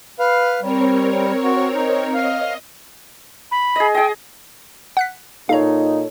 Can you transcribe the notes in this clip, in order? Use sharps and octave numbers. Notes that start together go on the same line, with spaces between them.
B4 F5
G3 C4 A#4 C#5
F#4
D#4
D#5 F5
B5
G#4 D#5
G#4 D#5 G5
F#5 F#6 B6
A#2 D#4 A4 C#5 F5 A#5